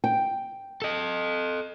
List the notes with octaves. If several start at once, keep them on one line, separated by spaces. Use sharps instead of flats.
G5
A4 D#5